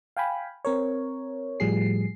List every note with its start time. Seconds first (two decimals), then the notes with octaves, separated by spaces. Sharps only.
0.17 F5 G5 G#5 B5
0.65 C4 A#4 C#5
1.60 A2 F3 G3 G#4 C7